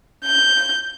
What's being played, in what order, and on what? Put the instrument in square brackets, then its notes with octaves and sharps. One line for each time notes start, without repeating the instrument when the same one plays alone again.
[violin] G6